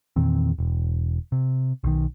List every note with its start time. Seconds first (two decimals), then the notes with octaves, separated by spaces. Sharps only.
0.16 E2 A#2 D#3 C4
0.58 E1
1.32 C3
1.84 B1 D#3